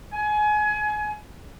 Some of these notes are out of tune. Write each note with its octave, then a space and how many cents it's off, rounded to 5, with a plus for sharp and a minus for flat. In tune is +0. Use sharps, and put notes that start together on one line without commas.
G#5 +25